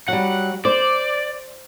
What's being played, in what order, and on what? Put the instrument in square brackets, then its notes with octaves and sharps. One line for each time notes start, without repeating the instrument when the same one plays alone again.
[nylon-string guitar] F#3 G3 [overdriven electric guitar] F#5
[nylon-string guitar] C5 [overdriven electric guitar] D5